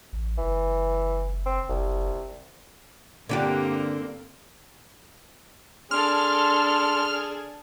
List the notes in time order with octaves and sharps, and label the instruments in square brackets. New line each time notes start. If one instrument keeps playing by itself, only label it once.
[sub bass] A1
[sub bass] F#1 [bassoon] E3
[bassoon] C4
[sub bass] F#1 [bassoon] C2
[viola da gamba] G2 A#3 C4 [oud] D3 D4 G4
[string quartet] D4 A4 [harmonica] G#4 [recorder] C6 [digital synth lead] F6